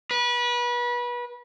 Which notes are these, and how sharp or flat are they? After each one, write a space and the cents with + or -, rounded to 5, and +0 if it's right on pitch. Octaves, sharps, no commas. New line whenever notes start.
B4 -30